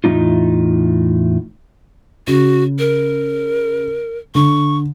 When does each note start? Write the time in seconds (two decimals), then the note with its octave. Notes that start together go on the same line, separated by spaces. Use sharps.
0.04 E2 A2 D3 A#3 D#4 F4
2.27 C#3 F#4
2.79 A#4
4.35 D3 C#6